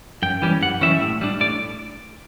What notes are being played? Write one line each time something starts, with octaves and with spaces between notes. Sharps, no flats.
F#2 G5
E3 G3 C#4
F#2 F#5
E3 G3 C#4 E5
A2
G3 D4
A2 D5